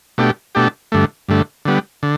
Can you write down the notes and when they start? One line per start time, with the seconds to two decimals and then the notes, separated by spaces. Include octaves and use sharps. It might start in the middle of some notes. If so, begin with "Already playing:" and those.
0.18 B2 A3 D4 G4
0.55 B2 A3 D4 G4
0.92 G2 D3 A3
1.29 G2 D3 A3
1.65 D3 G3 B3
2.03 D3